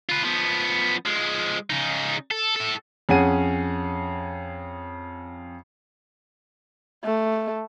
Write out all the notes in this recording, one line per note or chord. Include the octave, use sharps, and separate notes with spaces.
F4 B4
F3 B3
F3 G#3
C#3 D#4
A4
A2 A4
F2 C#4 G#4 F#5 D#7
A3